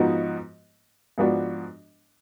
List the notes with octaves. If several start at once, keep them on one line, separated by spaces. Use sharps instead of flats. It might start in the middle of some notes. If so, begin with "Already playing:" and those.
Already playing: G#2 F3 B3 D#4 F#4
G#2 F3 B3 D4 F#4